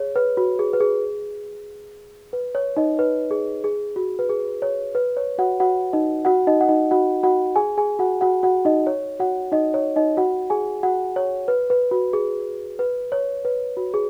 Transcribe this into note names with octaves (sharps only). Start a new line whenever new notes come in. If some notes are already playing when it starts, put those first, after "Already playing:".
Already playing: G#4 C#5
B4
F#4
G#4
B4
G#4
B4
C#5
D#4 D#5
B4
G#4
G#4
F#4
B4
G#4
C#5
B4
C#5
F#4 F#5
F#4 F#5
D#4 D#5
F#4 F#5
D#4 D#5
F#5
D#4 D#5
F#4 F#5
F#4 F#5
G#4 G#5
G#4 G#5
F#4 F#5
F#4 F#5
F#4 F#5
D#4 D#5
C#5
F#4 F#5
D#4 D#5
C#5
D#4 D#5
F#4 F#5
G#4 G#5
F#4 F#5
C#5
B4
B4
F#4
G#4
B4
C#5
B4
F#4
G#4